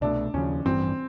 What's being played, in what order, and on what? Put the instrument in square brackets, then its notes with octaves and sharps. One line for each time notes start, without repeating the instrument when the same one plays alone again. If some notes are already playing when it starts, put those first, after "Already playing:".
[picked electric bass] C2 B2 F#3 A3 [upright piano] D4
[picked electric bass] D#2 C#3 F3 [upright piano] C#4
[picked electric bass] A1 G2 E3 G3 [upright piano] C4